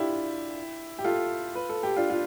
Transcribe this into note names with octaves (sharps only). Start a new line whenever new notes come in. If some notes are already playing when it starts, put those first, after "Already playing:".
Already playing: D4 E4 F4 G4
G4
F4 A4
B4
A4
G4
D4 F4
F4